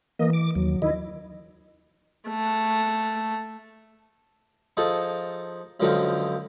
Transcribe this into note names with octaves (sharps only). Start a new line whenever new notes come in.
E3 A#3 D#5
D6
D#2 F#3
D#3 E4 D#5
A3
F3 D#4 G#4 A4
C#2 F#2 D3 F3 D#4 F5